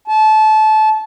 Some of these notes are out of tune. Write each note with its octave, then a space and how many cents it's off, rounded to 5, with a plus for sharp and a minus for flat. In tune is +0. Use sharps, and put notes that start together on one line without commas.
A5 -25